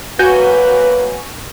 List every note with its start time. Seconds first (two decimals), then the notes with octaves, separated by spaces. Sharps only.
0.19 F#3 A#3 F#4 B4 G#5 G6